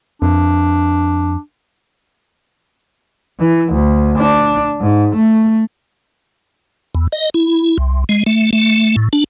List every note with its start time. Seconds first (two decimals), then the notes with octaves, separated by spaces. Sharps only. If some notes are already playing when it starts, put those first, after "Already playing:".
0.22 F2 D4
3.40 E3
3.73 D2
4.19 D4
4.81 G#2
5.16 A3
6.95 E2
7.12 D#5
7.34 E4
7.78 C2
8.09 G#3
8.26 A3
8.53 A3
8.96 A2
9.13 D4